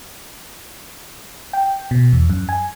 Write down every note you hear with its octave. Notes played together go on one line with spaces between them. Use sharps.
G5
B2
E2
F#2
G#5